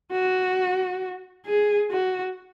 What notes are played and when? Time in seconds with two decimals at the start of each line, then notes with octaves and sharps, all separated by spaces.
0.12 F#4
1.46 G#4
1.91 F#4